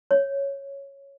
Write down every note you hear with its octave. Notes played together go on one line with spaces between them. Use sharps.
C#5